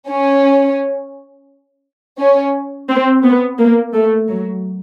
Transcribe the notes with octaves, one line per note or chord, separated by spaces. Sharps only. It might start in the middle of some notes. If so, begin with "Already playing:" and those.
C#4
C#4
C4
B3
A#3
A3
F#3